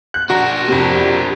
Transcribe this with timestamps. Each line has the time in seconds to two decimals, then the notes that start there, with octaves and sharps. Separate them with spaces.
0.14 F#6
0.30 D4 F#4 A#4
0.68 F2 C3